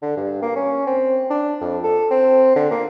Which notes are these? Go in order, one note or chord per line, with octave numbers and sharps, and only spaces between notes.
D3
G2
A#3
C#4
C4
D4
F2
A4
C4
D3
A#3